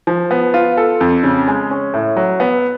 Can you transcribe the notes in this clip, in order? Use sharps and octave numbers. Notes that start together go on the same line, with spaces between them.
F3
B3
F4
A4
F2
C#3
G#3
C#4
A2
F#3
B3